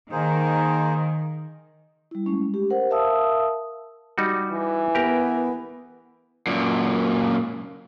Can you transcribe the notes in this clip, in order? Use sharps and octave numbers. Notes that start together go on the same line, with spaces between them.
D#3 A#3 G#4 C5
G3 E4
G#3 A3 C#4
G4
A#4 C5 F#5
A#4 E5 F5 A5 D#6 E6
G3 D#4 F#4
E3
B3 G4 A#4
F#2 A#2